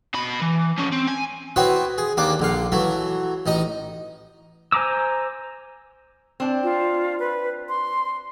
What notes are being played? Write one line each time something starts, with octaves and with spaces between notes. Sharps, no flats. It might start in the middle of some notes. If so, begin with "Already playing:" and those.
B2 B5
E3
F3 C#4
C4
G#5
B3 C4 E4 F#4 C#5
G#4
D#2 A#3 D4 D6
A#1 D3 F5
E3 F#3 A3
A1 D#4 D#5
C5 G#5 A#5 D6 E6
C4 D4
F4
B4
C6